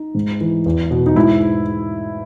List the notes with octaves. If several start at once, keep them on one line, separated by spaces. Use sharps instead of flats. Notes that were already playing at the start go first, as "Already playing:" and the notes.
Already playing: D#4
G#2
E3
E2
B2
D#4
G#2 E4